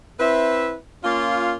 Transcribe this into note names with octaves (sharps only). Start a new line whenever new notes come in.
C4 E4 B4 E5
A#3 C#4 F4